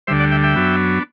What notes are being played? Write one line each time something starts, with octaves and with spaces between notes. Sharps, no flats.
D2 D3 G3 C5 E5
D5 F#5
E5 G5
E5 G5
F#2 F#3 B3 D4